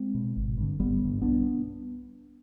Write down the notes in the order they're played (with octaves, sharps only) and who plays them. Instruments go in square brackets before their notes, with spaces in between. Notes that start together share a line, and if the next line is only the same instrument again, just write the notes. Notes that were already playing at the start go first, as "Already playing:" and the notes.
Already playing: [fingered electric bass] G#3 C4
B2
G#1
G2 D3
G#1 G3 B3
G2 D3
B1 B3 D4